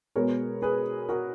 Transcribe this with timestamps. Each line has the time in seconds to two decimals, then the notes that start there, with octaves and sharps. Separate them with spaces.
0.16 B2 G#3 B3 A#4 C#5
0.62 G#4 B4
1.09 F#4 A#4